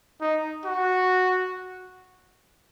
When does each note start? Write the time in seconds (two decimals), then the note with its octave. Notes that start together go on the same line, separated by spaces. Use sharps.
0.21 D#4
0.65 F#4